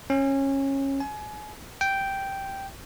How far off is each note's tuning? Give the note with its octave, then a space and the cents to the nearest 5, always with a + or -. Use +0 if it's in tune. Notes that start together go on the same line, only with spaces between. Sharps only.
C#4 -20
G#5 +30
G5 -5